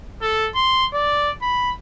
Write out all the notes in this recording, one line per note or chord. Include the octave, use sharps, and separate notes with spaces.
A4
C6
D5
B5